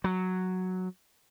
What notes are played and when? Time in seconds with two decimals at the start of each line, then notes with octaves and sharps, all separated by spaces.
0.04 F#3